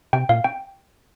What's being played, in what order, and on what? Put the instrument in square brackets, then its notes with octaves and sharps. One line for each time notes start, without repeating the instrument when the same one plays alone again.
[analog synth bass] C3 [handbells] G5
[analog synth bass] A#2 [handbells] F5
[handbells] G5